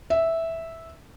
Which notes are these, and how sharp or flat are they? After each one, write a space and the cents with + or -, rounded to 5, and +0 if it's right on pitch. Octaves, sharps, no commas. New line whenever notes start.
E5 -5